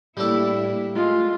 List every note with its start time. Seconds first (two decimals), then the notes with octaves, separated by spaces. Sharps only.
0.17 A2 G3 A#3 D4 E4 A4
0.95 G#3 A3 F4